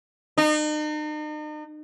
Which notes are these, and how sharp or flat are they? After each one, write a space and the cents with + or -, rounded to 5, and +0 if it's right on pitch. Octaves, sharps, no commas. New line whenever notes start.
D#4 -40